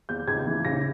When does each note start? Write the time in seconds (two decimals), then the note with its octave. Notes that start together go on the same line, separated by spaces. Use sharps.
0.09 E2 G6
0.27 C#2 G#6
0.47 E3
0.65 C#3 A#6